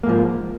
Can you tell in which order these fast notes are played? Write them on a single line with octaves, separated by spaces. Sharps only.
A#3 G#2 F3